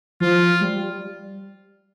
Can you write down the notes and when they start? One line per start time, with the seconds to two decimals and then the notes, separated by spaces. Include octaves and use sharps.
0.20 F3 F4
0.61 G3